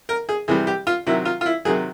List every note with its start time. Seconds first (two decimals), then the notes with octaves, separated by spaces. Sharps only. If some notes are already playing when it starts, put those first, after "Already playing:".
0.09 A#4
0.29 G#4
0.48 C3 E3 G3 G#4
0.67 G4
0.87 F4
1.07 C3 D#3 F#3 E4
1.25 F4
1.41 F4
1.46 E4
1.65 C3 D#3 F#3 G#4